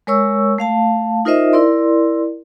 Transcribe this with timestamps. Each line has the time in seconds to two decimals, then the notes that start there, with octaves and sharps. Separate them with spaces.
0.07 G#3 A#4 C#5 C#6 E6
0.58 A3 F5 A5
1.25 D#4 F4 A#4 C5 D#5 E5
1.53 E4 A#4 D5 C6